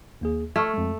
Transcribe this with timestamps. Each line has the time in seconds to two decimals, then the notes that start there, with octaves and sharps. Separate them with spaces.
0.21 D#2 A#3 G#4
0.56 A3 C#6 F6 G#6
0.74 F2 G#3